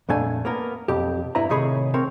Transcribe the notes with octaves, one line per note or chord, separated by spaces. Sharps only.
F2 A#2 A3 D4 G#5
A#3 B3 A#4
B1 F2 G4
G2 E4 B4 A#5
A2 C3 D#3 G#4 C#5 B5
C4 A#4 C#5